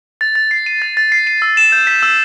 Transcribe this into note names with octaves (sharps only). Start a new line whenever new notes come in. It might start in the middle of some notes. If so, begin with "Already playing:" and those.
A6
A6
C7
D#7
A6
A6
C7
D#7
E6
E7
G6
B6
E6